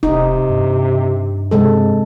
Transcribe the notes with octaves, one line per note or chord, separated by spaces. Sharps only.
E1 C3 D#4
G2
C3 G#3 A4